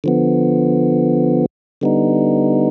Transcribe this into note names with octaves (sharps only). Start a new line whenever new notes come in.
D3 F3 B3
D3 G3 B3 D#4